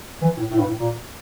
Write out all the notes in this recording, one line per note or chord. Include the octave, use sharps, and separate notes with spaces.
E3
A2
A2
G2
A2
A#2